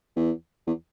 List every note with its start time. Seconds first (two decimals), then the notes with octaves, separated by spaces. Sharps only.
0.16 E2
0.67 E2